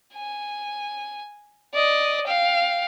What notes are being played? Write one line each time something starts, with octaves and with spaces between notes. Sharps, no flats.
G#5
D5 D#5
F5 G5